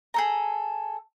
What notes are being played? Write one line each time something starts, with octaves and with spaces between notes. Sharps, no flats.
G#4 A4 A#5